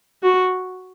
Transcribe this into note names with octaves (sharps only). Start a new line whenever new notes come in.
F#4